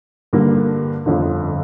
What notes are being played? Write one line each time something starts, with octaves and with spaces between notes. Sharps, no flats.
G2 D3 G3 A#3
G1 F2 D3